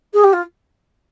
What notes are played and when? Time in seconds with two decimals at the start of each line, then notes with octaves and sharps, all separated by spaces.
0.13 G#4
0.23 G4
0.33 F4